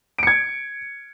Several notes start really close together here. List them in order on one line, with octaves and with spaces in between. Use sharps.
D7 C#7 G#6